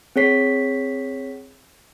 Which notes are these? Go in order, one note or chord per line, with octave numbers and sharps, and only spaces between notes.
C4 G#4 C#5 B6 C7